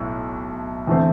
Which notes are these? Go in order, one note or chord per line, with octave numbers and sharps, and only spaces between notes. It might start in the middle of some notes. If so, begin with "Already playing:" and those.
Already playing: B1 A2
E2 D3 A3 C4